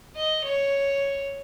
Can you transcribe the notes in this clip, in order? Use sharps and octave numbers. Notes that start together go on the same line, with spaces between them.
D#5
C#5